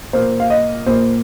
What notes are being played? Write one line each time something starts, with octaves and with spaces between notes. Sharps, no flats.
A#2 A#3 C5
F5
D#5
A#2 A#3 C5